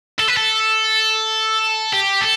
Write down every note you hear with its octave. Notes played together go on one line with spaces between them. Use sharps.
A4
B4
A4
G4
A4